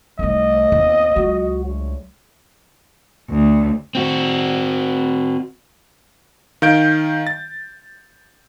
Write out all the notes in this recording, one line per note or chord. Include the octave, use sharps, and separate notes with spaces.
C2 A3 D#4 D#5
D#2 A#2 B3 C4
C#2 F#3 F#4
D2 G#3 C#5
D2
C4 F#4
D#3 F5 G6 D7
A6